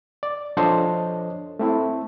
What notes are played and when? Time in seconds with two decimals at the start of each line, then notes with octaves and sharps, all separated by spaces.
0.23 D5
0.57 F3 D4 A4 C5 C#5 D#5
1.59 A3 C4 E4